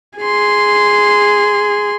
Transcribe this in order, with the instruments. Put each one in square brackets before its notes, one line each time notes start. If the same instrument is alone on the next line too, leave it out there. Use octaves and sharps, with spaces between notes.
[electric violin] G#4 C6